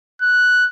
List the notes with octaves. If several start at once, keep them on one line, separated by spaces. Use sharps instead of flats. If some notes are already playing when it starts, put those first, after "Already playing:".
F#6